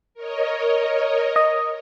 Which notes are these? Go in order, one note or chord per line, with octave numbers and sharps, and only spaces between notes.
A#4 C#5 D#5
D#5